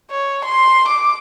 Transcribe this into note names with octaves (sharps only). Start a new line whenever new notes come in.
C#5
C6
D6